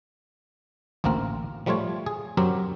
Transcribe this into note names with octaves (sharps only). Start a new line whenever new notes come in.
A1 D2 A#3 C4 A#4
F3 G3 A3 F4 C#5
G#4
F#2 F#3 C4 G4 A#4